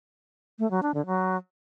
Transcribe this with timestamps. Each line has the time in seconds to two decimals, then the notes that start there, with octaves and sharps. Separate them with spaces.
0.59 A3
0.71 F#3
0.83 D4
0.94 D3
1.06 F#3